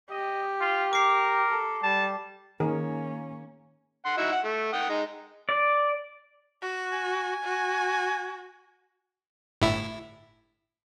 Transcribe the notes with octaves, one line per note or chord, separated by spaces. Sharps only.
G4 D#5
F4
A#4 D6 C7
A4
G3 A5
D#3 A#3 C#4 G#4 A#4
F#5 C6
D#4 E4 F#4
F#5
A3
F#5 G5 D#6
G#3 D#4
D5
F#4
G#5
F#4
G1 A2 E4